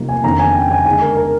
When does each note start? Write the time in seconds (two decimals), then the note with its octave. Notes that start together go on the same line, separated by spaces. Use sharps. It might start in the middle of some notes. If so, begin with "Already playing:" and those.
Already playing: C3 F3 A#3 D#4
0.09 G#5
0.24 F2 D#3 A#3 D4 A#5
0.39 G#5
0.55 G5
0.71 G#5
0.86 D3 G#3 D#4 G#5
1.01 A#4
1.17 A#4